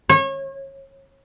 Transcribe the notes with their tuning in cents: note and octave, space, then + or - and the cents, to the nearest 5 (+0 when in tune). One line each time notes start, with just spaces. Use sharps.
C#5 -30